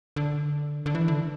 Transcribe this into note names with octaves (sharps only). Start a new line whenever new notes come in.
D3
D3
E3
D3